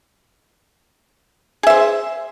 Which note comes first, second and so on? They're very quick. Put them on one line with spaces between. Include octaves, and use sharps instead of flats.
G#4 E5 C5